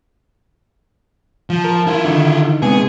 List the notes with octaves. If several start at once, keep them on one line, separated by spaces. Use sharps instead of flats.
F3
A#4
E4 F4
D3 D#3 D#4
C3 G#3 B3 G#4